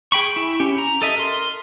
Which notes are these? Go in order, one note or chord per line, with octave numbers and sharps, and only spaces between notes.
G#4 G5 B5 C#6
E4
C#4 G4
A#5
A4 D#5 E5
A#4 C6